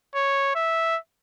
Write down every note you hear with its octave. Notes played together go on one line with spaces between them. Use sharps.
C#5
E5